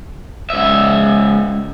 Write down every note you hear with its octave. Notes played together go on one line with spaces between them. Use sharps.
C#2 E5